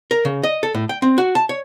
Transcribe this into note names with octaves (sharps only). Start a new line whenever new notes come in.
A#4
C#3
D#5
A4
A2
G5
C4
F#4
A5
C#5